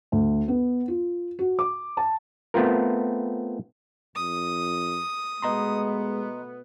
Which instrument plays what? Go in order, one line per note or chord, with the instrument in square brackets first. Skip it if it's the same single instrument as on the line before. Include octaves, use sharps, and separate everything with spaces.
[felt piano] D2
B3
F4
F#4
D6
A5
[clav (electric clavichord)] A3 B3 C4 F4 A#4
[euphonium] F2 [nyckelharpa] D#6
[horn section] B2 A3 B3 [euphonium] G#3 [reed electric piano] D#5 A#5 C6